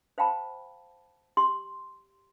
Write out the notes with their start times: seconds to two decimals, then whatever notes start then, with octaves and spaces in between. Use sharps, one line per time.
0.18 C5 F5 G5 A5 B5
1.37 G4 C6